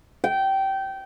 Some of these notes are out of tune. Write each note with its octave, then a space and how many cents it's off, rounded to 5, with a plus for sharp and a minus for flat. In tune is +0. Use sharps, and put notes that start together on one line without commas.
G5 -20